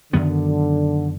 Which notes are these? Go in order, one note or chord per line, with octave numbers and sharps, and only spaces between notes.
F#2 D3 D#3 F#3 B3